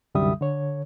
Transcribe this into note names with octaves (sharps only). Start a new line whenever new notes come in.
C2 F#2 D3 G3 E5 D#6
D3 C#5